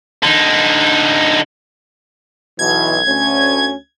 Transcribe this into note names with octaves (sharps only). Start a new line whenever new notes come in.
D3 D#4
B1 B2 E3 G#6
D2 C#4